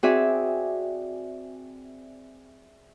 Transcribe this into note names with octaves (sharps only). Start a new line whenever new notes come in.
C4 F#4 G#4 D5 E5